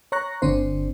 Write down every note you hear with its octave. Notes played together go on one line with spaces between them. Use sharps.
C#5 A#5 C#6 F#6 A#6
G1 D3 C4 D4 C5